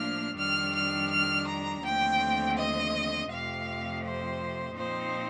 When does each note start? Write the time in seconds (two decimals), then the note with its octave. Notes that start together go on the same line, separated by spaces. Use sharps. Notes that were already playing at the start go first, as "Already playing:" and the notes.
Already playing: A2 F3 A#3 D4 F6
0.37 F2 D#3 G3 D4 F6
0.74 F6
1.10 F6
1.47 A#5
1.83 D#2 D3 F3 A3 C4 G5
2.56 D#5
3.30 F2 C3 F3 A3 F5
4.04 C5
4.76 A#2 F3 C4 D#4 C5